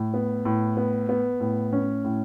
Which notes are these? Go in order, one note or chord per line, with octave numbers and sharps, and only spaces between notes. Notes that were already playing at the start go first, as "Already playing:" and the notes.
Already playing: A2
B3
A2
B3
B3
A2
C#4
A2